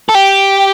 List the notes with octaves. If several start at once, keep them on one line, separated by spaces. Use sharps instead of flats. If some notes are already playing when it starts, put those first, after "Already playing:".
A4
G4